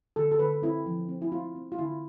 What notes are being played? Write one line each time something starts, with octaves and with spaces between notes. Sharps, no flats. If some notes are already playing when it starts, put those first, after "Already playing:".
D3 A4
A4
D3 B4
C4 E4
F3
C4
E4
C4 F4
C4
F4
D3 E4